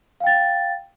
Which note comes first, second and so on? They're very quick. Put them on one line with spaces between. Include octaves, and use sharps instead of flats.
F5 G5 A6